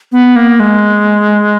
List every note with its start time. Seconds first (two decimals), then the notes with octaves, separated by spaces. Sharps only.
0.12 B3
0.36 A#3
0.60 G#3